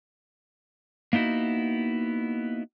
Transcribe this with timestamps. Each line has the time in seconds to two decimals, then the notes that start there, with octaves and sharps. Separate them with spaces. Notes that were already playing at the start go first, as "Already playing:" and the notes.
1.13 A#3 B3 D#4 E4 F#4